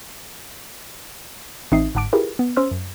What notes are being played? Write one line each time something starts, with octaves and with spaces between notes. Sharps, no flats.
A1 C4 D#4 E5 D#6 C7
G1 G#2 F#5 A5 D6 D7
E4 F4 G4 G#4 A#4 B4
B3
C#4 C5 C6 E6 F6
F#2